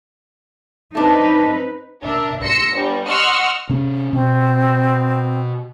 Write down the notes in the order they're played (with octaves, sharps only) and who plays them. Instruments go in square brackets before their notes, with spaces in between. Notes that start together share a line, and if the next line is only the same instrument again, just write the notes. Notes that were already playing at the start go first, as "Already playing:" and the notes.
[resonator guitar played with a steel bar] A3 D4 [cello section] C4 D#4 B4
[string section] D4 A#4 E5
C6 E6 A#6 C#7
G1 G3
D#5 F#5 C6 C#6 E6 F6
[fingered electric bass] C3 C#4
[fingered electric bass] B2 [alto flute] C4